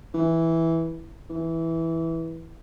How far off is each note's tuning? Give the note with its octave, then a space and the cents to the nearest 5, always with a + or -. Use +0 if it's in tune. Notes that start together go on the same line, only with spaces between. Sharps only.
E3 -5
E3 -10